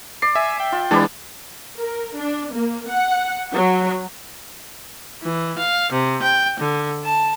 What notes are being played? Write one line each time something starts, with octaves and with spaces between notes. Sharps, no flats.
D5 C7
E5 G#5
G5
F4
E3 G#3 D4 B4 D5 A5
A#4
D4
A#3
F#5
F#3
E3
F5
C3
G5
D3
A5